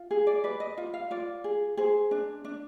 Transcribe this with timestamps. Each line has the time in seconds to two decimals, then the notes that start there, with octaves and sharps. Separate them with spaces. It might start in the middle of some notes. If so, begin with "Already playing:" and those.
Already playing: F4
0.11 G#4
0.27 D5
0.44 B4 D5
0.60 D#5
0.78 F4
0.94 F5
1.11 F4 D5
1.44 G#4
1.77 G#4 C5
2.11 D4
2.45 D4